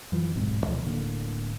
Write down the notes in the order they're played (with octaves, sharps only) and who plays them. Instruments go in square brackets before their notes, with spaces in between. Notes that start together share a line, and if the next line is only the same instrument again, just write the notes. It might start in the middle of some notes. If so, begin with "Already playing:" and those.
[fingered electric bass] F#2 E3 F3
D1 B1 G#2 C4
D2 B2 F3 A3
D1 A2 D3 A#3